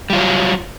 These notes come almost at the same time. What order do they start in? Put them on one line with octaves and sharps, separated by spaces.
G3 F4 F#3